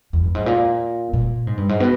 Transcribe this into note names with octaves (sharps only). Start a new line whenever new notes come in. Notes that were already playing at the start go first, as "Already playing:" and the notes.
E2
G2
G#2
A#2
A#2
G#2
G2
G#2
B2